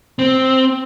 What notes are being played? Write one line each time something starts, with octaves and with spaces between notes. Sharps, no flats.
C4